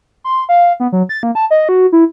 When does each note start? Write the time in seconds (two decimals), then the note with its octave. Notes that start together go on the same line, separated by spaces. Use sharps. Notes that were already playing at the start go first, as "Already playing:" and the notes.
0.24 C6
0.49 F5
0.80 B3
0.92 F#3
1.09 A6
1.23 A#3
1.35 A5
1.51 D#5
1.69 F#4
1.92 E4